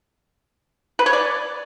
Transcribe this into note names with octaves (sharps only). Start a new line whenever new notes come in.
B4
C#5
D5